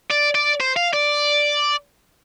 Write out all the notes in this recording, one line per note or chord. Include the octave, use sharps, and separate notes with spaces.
D5
D5
C5
F5
D5